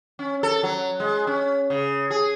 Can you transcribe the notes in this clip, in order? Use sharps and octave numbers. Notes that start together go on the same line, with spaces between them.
C#4
A4
F#3
G#3
C#4
C#3
G#4